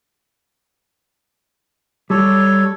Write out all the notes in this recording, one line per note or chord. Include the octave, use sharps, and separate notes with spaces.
G3 A4 C#5